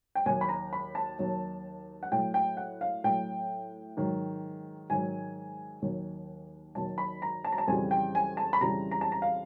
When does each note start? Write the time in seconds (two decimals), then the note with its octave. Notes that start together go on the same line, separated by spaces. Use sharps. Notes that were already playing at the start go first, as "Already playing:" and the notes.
0.15 G5
0.26 D#2 D#3 F#3 G#5
0.41 B5
0.49 A#5
0.73 B5
0.95 A5
1.19 D#2 D#3 F#3
2.03 F#5
2.12 A2 F#3 G5
2.34 G5
2.57 F#5
2.81 F5
3.04 A2 F#3 G5
3.97 G#2 D#3 F#3
4.90 G#2 D#3 F#3 G#5
5.82 D#2 D#3 F#3
6.75 D#2 D#3 F#3 A5
6.98 B5
7.22 A#5
7.45 A5
7.52 A#5
7.58 A5
7.68 F2 C#3 E3 G3 G#5
7.91 G5
8.15 G#5
8.37 A5
8.53 B5
8.61 F2 C#3 E3 G3 A#5
8.91 A#5
9.01 A5
9.12 A#5
9.22 F5